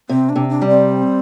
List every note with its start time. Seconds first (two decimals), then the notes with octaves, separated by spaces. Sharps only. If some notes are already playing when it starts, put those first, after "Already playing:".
0.09 C3 C4
0.29 D4
0.36 C3
0.49 D4
0.61 G3
0.68 C4